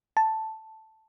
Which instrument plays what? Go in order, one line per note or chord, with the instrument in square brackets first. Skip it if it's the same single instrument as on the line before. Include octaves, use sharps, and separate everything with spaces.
[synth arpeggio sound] A5